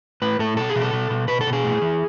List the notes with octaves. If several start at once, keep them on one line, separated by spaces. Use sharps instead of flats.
A2 B4
A2 A4
B2 A4
G#4
B2
A4
B2
B2
B2 B4
A4
B2
G#4
A2
E3